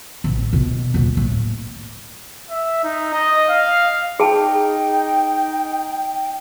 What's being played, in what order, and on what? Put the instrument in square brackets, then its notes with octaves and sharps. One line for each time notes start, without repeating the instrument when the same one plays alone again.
[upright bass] A1
B2
D#1
A2
[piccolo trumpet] E5
D#4
D#5
F5
[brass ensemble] D#4 [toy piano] G#4 A5 [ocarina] G5